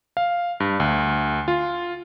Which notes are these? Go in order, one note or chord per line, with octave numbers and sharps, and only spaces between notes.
F5
G2
D2
F4